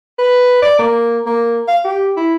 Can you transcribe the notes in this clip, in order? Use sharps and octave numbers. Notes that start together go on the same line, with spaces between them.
B4
D5
A#3
A#3
F5
G4
E4